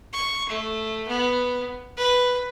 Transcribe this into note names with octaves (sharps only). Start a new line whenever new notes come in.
C#6
A3
B3
B4